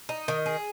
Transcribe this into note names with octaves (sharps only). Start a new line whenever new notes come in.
D#4
D#3
G#4